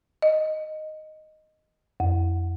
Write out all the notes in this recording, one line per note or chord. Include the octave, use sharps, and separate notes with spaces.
D#5
F2